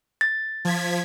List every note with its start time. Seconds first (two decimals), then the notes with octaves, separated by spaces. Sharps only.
0.21 A6
0.65 F3 G#6 B6